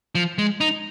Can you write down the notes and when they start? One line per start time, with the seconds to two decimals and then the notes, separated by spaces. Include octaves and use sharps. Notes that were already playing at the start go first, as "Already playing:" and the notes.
0.15 F3
0.38 G#3
0.61 D#4